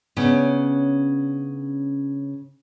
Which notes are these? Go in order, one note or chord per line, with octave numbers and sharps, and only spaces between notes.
C#3 B3 C#4 D4